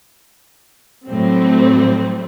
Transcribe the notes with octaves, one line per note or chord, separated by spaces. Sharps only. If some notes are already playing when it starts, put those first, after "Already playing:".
A2 F#3 G3 A3 C4